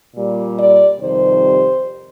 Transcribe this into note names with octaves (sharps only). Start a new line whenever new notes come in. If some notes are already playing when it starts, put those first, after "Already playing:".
A#2 G3
D5
F2 C3 D#3 G3 C5